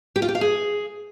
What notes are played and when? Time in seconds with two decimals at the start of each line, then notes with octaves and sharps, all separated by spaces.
0.16 G4
0.22 F4
0.28 G4
0.35 F5
0.41 G#4